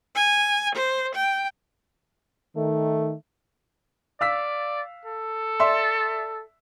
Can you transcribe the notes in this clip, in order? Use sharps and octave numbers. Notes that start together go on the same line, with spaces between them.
G#5
C5
G5
D#3 A3
D5 F5 E6 B6
A4
D5 E5 C6